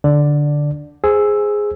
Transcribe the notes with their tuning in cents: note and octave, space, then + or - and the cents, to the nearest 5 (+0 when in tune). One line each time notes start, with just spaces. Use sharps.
D3 +0 D5 +0
G#4 +0 C5 +0 E6 +0